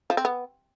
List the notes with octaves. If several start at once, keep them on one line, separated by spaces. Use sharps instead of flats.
F3
C4
B3